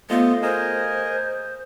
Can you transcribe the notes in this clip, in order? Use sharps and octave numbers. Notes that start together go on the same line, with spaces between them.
A3 B3 F4 C5 D#5
G#4 A#4 C5 D#5